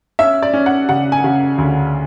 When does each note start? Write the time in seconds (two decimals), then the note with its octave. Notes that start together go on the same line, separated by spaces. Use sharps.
0.19 C#4 E5
0.42 D5
0.54 C#4
0.66 F#5
0.89 C#3 F#5
1.12 G#5
1.24 C#3
1.58 D2